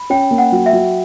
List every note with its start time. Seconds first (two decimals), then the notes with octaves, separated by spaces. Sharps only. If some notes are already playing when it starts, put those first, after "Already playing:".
Already playing: B5
0.10 C#4 G5
0.31 A#3
0.38 F#5
0.52 F#3
0.66 E5
0.73 F#3